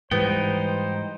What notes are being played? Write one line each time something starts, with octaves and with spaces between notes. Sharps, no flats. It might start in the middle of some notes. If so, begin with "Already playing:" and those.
G#2 E3 G3 B3 D#4 C5 G5